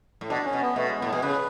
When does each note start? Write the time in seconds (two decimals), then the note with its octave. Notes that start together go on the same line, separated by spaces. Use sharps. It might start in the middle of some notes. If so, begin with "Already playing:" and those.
0.21 A2
0.29 B2 D4
0.45 C#4
0.53 B2
0.61 B3
0.75 B2 A3
0.88 G#3
0.99 A2 B3
1.10 B2 G#4
1.22 C#3 B4